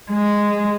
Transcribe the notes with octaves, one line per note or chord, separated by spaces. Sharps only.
G#3